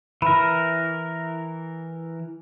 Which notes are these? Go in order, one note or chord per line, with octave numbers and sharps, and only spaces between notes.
E3 A#4 B5